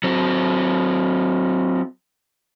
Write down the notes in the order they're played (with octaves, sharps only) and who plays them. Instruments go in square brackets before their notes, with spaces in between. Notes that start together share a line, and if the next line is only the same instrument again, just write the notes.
[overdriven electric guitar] F#3 C4